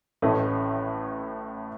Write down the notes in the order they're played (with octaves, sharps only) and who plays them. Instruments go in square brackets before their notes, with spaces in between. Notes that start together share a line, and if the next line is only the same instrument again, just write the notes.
[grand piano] A1 A2 A3 C#4 D#5